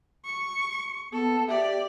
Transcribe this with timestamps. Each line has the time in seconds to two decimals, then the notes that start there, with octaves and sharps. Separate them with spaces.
0.25 C#6
1.12 B3 A4
1.49 G4 D5 E5